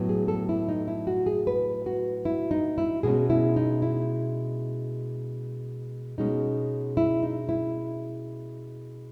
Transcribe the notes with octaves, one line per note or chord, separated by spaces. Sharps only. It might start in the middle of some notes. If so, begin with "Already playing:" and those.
Already playing: A2 F#3 B3
G#4
A4
E4
D#4
E4
F#4
G#4
B4
F#4
E4
D#4
E4
B2 G#3 C#4 G#4
E4
D#4
E4
B2 G#3 C#4 D#4
E4
D#4
E4